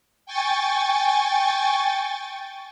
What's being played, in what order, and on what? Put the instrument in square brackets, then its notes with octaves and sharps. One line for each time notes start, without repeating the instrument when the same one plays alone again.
[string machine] G5 G#5 C#6 A6